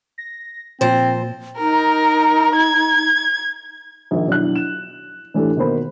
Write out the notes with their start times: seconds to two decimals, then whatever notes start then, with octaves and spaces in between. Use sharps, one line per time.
0.18 A#6
0.81 A#2 F3 C4 C5
1.59 D#4 A#4
2.56 G#6
4.11 A#1 D#3
4.27 B1 D4 E4 F#6
4.56 E7
5.34 A2 E3 D4 G4 A4
5.57 B2 D#3 A#3 C5 B5